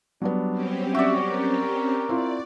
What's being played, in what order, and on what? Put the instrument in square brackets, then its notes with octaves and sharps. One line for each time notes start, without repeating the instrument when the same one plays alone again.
[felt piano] F#3 G3 B3 [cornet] D4
[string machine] C4 C#4 G4
[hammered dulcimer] F#4 D5 [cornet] E5
[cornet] A#4
[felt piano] C4 E4 F4 [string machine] D5